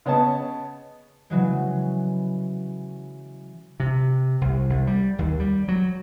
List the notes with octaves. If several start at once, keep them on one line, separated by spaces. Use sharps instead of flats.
C#3 B3 C#5 D#5 A5
C#3 E3 F#3 G#3
C3
C2
C2
G3
D#2
G3
F#3